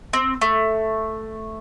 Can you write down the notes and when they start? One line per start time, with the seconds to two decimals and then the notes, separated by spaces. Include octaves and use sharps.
0.13 C4
0.41 A3